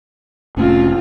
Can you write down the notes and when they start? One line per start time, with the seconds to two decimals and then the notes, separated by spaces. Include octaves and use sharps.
0.57 F1 A2 C4 C#4 F4